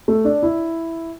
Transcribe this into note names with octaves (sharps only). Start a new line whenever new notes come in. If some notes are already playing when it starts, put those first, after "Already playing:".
A3
D4
E4